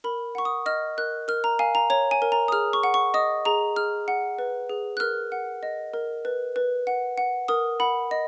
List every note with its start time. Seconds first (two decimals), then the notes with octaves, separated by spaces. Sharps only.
0.04 A#4 B5
0.35 F#5 C#6
0.45 D#6
0.66 D#5 F6
0.98 A#4 F#6
1.28 A#4 F6
1.44 A#5
1.59 F5 G#5
1.75 A#5
1.90 C#5 A#5
2.11 G#5
2.22 A#4
2.32 A#5
2.48 D#6
2.52 G#4 F6
2.73 C#6
2.83 F#5
2.94 C#6
3.14 D#5 D#6
3.45 G#4 A#5
3.76 G#4 F6
4.08 F#5
4.39 B4
4.70 G#4
4.97 F#6
5.00 A#4 F6
5.32 F#5
5.63 D#5
5.94 A#4
6.25 B4
6.56 B4
6.87 F#5
7.18 F#5
7.48 A#4 D#6
7.80 F#5 B5
8.11 D#5